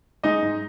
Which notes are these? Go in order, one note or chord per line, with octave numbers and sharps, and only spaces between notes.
G#3 D#4 D#5
G#2